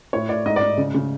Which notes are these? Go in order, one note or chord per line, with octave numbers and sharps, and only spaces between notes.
A2 C#5
A2 D5
G#2 D#5
D5
G#2
C#3
C#3